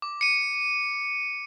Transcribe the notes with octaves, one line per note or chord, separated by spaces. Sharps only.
D6
C#7 D#7